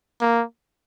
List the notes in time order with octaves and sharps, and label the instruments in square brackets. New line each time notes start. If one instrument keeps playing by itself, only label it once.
[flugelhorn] A#3